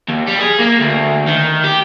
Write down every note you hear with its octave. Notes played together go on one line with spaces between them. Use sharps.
D#2
G3
G#4
A#3
D2
D#3
G4